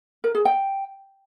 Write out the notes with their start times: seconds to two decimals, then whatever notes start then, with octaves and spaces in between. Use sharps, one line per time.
0.24 A#4
0.35 G#4
0.45 G5